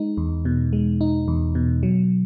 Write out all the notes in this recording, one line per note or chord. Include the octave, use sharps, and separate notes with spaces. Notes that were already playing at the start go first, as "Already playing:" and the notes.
Already playing: G#3 D#4
E2
B2
G#3
D#4
E2
B2
F#3